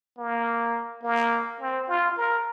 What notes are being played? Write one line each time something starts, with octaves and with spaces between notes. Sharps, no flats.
A#3
A#3
C4
F4
A#4